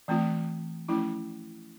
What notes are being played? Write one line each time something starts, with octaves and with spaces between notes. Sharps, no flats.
E3 A3 C4 F4
F3 A3 C#4 E4